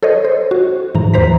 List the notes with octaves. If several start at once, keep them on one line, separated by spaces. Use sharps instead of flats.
A4 C5 C#5 D#5
C5
F#4
G#2 E3 A#5
D#2 E3 C5 A#5 B6